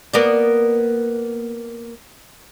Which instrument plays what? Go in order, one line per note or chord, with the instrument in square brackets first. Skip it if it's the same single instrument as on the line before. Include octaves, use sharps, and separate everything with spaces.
[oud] A#3 B3 D5